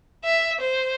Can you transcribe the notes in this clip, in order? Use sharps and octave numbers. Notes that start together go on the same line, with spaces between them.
E5
C5